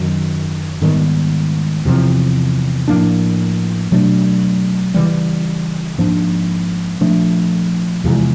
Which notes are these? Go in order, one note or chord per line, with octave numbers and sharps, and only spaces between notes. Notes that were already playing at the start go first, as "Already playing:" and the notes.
Already playing: F#2 D#3 F#3
G#2 D#3 G3 B3
E2 C3 F3
A2 F3 A#3 D4
B2 F#3 A3 D4
C#3 E3 G3
G#2 F3 A#3 D4
A#2 F3 A3 D4
E2 C3 F3 G#3